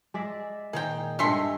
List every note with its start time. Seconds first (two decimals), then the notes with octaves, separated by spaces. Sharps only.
0.14 G#3 D5 E5
0.73 A#2 D#3 G#4 A#4 G5
1.19 G2 G#3 A3 G#4 E5 C6